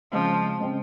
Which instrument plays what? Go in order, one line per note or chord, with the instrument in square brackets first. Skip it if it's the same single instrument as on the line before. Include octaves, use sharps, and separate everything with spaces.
[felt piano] C#3 G#3 C4 [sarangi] F3
[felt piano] C#3 G#3 C4